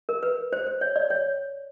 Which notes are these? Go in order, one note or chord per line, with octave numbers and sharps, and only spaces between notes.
A#4
B4
C5
C5
C#5
D5
C#5